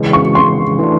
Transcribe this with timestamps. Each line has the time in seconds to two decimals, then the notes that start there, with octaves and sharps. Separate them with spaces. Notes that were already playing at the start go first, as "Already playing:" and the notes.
Already playing: C#3 E3 G#3 C#4
0.13 C#6
0.35 C6
0.79 E3 A3 D4